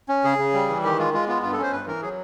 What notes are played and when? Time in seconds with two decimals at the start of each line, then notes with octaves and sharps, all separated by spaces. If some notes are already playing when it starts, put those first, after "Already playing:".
0.09 C#4
0.24 C#3 G#4
0.38 C#3
0.54 G3
0.69 E3
0.83 D#3 G4
0.98 G#3 F4
1.13 G#3 F4
1.28 B3 F4
1.42 G2 F4
1.53 A4
1.58 C#4 C5
1.72 G2 B4
1.87 E3 A#4
2.02 F#3 G#4